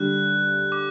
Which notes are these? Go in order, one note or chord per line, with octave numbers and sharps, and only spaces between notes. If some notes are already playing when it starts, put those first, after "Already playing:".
Already playing: D3 G3 F#6
D6